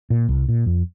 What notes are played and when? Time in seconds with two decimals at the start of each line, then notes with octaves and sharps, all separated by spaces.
0.10 A#2
0.29 C2
0.48 A#2
0.66 F2